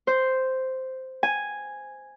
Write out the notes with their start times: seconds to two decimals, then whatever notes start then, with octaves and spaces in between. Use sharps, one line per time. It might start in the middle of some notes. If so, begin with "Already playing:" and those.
0.07 C5
1.23 G#5